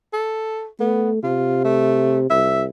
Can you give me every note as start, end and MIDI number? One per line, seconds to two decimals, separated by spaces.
0.13 0.67 69
0.80 1.20 57
0.80 1.11 59
1.24 2.27 48
1.24 1.64 65
1.65 2.20 57
2.30 2.66 36
2.30 2.64 76